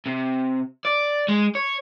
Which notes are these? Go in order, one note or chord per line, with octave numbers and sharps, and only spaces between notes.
C3
D5
G#3
C#5